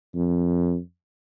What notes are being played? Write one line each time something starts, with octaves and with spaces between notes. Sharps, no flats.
F2